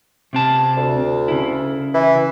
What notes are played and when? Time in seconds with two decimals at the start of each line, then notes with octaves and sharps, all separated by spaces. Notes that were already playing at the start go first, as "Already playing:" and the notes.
0.33 C3 C4 A5
0.77 D2
1.28 C#3 E4
1.94 E3